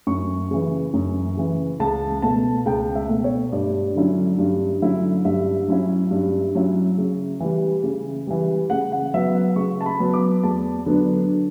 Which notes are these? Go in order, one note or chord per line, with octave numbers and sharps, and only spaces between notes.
F#2 C#6
C#3 E3
F#2
C#3 E3
C#2 A5
B2 A3 A5
C#2 G5
E5
B2 A3
C#5
G2 D5
D3 F#3 C#4 E4
G2
D3 F#3 C#4 E4
G2 E5
F#3 C#4 E4
G2
F#3 C#4 E4
C#3
E3 G3
C#3
E3 G3
C#3 F#5
F#5
F#3 B3 E5
F#5
C#3 C#6
A5
B5
F#3 B3
D6
E2 A5
D3 F#3 B3 D4